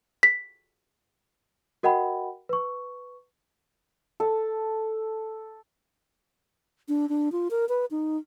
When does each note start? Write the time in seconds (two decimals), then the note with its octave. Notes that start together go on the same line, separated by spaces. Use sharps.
0.23 B6
1.83 F#4 A#4 D#5 F#5 G5 B5
2.49 B4 C#6
4.20 A4
6.88 D4
7.09 D4
7.32 F4
7.51 A#4
7.69 B4
7.91 D#4